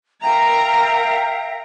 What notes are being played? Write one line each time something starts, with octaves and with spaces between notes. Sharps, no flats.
A#4 E5 F5 G5 A#5